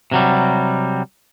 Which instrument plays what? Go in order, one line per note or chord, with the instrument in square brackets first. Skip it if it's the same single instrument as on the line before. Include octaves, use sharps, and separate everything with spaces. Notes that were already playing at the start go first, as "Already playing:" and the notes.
[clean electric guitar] C3 F#3 G3